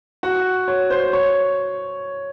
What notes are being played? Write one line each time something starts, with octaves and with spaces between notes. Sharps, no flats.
F#4
C#5
C5
C#5